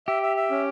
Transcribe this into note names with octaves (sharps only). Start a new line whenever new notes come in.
G4 E5
E5
E5
C#4